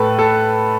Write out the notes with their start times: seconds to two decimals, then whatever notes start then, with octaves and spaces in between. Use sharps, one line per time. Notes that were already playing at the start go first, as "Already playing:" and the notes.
Already playing: A2 A4 B4
0.18 A4